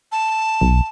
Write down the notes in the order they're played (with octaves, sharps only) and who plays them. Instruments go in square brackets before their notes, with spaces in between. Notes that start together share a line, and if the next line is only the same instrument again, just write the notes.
[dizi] A5
[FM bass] B1